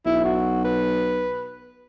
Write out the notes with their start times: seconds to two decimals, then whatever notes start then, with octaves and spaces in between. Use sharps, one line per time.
0.06 B1 E4
0.25 F#4
0.65 B4